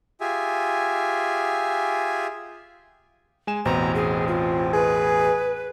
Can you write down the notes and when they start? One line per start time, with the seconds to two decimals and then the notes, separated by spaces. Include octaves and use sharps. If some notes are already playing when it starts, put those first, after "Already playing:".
0.21 F4 G4 G#4 E5 G#5
3.47 G#3 G#5 E7
3.65 A1 E2 B2 C4 A#5
3.95 G#4
4.28 F4
4.73 G#4 B4